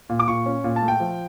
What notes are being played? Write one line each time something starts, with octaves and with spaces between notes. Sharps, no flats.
A#2
D6
A#2 C#6
C#4
A#2
A5
A3
G5
F3